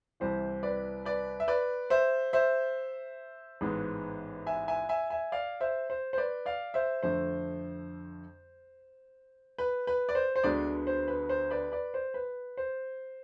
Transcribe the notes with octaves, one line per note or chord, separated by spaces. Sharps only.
C2 C3 E3 C5
B4 D5
B4 D5
E5
B4 D5
C5 E5
C5 E5
A1 G#2 G#3 B3
E5 G#5
E5 G#5
E5 G#5
E5 G#5
D5 F5
C5 E5
C5
C5
B4 D5
D5 F5
C5 E5
F2 D3 A3 C5
B4
B4
D5
C5
C5
D2 D3 G#3 B3 B4 D5
C5
B4
C5
B4 D5
B4 D5
C5
B4
C5